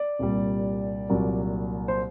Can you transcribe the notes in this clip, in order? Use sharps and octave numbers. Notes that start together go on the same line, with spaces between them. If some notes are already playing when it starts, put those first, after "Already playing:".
Already playing: D5
C2 A#2 G3
C2 A#2 F#3 A#3
C5